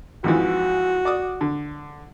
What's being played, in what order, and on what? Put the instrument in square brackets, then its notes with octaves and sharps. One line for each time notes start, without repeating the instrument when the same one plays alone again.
[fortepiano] F2 G#2 E3 [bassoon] F#4
[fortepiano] D5 D6 D#6
D3